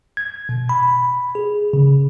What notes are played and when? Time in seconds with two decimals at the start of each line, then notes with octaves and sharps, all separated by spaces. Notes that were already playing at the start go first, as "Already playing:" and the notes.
0.17 G#6
0.49 B2
0.69 B5
1.35 G#4
1.73 C#3